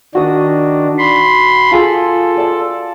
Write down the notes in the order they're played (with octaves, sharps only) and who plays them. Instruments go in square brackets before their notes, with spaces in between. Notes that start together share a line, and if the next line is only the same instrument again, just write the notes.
[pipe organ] D#3 D4 [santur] F#4 D#6
[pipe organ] B5 C6
[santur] F4 G#4 [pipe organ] A4
[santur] D5 A5